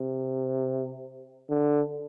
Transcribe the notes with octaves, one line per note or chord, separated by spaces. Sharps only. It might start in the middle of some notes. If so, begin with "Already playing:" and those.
Already playing: C3
D3